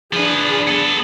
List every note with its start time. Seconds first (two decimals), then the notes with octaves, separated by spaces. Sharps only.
0.13 F3 D4 G#4 B4
0.67 B3 A4